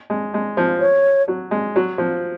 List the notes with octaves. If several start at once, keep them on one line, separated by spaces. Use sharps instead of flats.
G#3
G#3
F3
C#5
F#3
G#3
F#3
F3